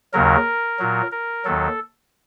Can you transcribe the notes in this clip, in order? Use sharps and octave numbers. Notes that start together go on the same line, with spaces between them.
D#2 C#3 F#3 A#4
A#2 F#3
A#4
D#2 D#3 F#3 A4